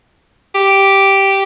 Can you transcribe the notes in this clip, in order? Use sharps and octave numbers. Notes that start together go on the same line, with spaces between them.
G4